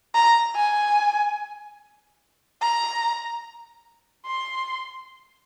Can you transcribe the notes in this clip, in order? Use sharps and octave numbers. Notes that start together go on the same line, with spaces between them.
A#5
G#5
A#5
C6